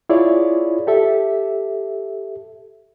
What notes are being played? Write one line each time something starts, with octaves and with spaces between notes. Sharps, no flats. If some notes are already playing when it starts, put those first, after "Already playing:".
E4 F4 G#4 C#5 D5
G4 A4 E5